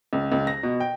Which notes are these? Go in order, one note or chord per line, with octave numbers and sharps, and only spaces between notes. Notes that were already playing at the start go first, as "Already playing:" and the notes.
C#2
C#2
A#6
B2
G5